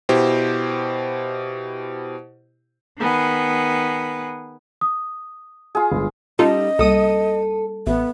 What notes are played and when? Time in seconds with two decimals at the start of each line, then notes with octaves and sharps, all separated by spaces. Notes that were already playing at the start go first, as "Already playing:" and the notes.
0.09 B2 E4 G4 C5
2.98 D#3 B3 G#4 B4
4.81 D#6
5.75 F4 G#4
5.92 G1 G#3
6.39 G3 C#4 D#4 F4 A4 D#5
6.79 C2 G3 A#3 A4 D#6 D#7
7.87 A1 B3 E5